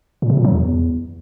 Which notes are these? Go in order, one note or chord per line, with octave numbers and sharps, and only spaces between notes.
A#2
C3
A#2
F#3
E2